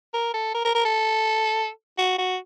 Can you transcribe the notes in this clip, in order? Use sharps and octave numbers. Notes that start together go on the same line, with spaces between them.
A#4
A4
A#4
A#4
A#4
A4
F#4
F#4